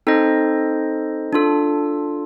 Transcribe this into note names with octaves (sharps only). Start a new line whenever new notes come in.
C4 D#4 A4 C5 D#5
D4 F4 A4